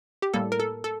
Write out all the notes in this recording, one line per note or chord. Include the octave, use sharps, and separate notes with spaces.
G4
A2 G3 A#3 A4
A#4
A4
A4